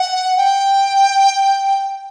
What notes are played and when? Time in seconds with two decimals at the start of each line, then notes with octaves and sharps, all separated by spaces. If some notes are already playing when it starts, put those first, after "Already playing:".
Already playing: F#5
0.37 G5